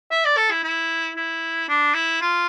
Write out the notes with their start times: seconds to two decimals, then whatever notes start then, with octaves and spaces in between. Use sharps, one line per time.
0.11 E5
0.25 D5
0.37 A4
0.51 E4
0.64 E4
1.17 E4
1.69 D4
1.95 E4
2.21 F4